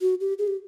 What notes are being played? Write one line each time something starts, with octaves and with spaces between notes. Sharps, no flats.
F#4
G4
G#4
G4